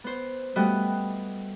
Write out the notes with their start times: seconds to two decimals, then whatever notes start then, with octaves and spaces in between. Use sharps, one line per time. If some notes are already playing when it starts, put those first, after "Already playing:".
0.04 B3 C5
0.56 G3 A3 B3 F#4 B4 D#5